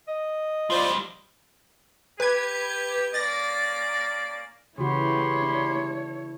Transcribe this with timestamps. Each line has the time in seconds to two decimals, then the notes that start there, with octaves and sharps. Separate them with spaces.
0.08 D#5
0.70 F3 G3 F4 C5 D5
2.20 G4 B4 G#6
3.14 A#3 C#4 D5 A6 A#6
4.78 C#3 E3 E4 F#4 G4 C#5 B5 C6
5.42 D4